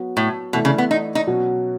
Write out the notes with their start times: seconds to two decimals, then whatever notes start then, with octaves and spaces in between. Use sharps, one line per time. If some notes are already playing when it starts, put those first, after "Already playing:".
Already playing: F#3 B3 F#4
0.17 A2
0.53 B2 E3 A3 E4
0.65 C#3
0.78 B3
0.91 D#4
1.15 D#4
1.27 B2 F#3 C#4 F#4